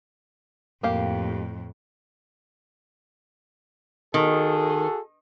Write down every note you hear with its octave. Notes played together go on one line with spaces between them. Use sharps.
F2 A2 A#3 G4 F5
D#3 F#4 G#4 A4